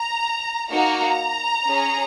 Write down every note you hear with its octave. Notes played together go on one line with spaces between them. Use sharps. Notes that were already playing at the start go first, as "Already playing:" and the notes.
Already playing: A#5
A#3 D#4 F#4 A#5
C#4 G#4